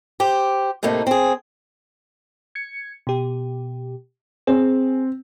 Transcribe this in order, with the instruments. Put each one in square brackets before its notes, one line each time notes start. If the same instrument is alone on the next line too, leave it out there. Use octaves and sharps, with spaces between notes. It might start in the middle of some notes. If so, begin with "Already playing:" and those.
[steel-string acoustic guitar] G4 C5
A2 C3 A3 A#3 D#4
C4 G#4
[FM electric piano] G#6 C#7
B2 G4
[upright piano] C4 [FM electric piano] G#4